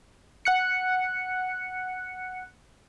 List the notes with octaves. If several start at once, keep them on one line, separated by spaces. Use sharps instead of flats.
F#5 F#6 C#7